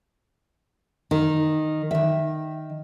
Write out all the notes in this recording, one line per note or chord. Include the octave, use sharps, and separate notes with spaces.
D#3
D#3 E5